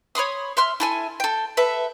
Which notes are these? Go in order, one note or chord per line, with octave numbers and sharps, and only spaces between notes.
C#5 B5 C6 D#6
E5 C6 F6
E4 A4 G#5
A4 G5
A4 B4 E5